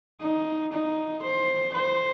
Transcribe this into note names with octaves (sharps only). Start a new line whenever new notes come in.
D#4
D#4
C5
C5